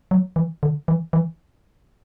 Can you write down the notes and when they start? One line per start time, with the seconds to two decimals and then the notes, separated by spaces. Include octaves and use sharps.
0.11 F#3
0.36 E3
0.63 D3
0.88 E3
1.13 E3